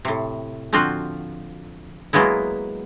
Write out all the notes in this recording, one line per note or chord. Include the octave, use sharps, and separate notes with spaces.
A2 C3
D3 F3 C4 F4 F#4
F#3 G#3 A#3 B3 E4